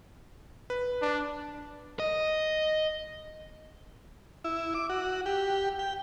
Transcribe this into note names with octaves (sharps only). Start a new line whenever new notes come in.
B4
D4
D#5
E4
D6
F#4
G4
G5